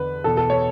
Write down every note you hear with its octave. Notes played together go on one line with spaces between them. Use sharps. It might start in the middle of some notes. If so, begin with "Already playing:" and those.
Already playing: E2 D3 B4
E2 B2 A4
A4
C#5